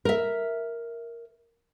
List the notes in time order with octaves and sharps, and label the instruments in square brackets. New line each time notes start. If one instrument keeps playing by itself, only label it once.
[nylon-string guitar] A#4 E5